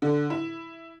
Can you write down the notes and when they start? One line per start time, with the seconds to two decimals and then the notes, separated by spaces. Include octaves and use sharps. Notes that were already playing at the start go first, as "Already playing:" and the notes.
0.02 D3
0.30 E4